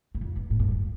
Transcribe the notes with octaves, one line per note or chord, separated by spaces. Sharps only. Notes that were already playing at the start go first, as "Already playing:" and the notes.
E2
F2
G2
A2
G2
F2